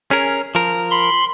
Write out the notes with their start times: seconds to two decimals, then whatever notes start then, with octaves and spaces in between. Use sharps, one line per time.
0.11 C#4 G#4 A#4
0.55 F3 A#4
0.91 B5 C6